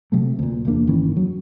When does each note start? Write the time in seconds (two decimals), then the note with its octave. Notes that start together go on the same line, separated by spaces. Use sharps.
0.12 C3 F#3 A3
0.39 D2 A#2
0.65 F1 E2 A#3 D4
0.87 G1 D#3 E3 C#4
1.17 F#3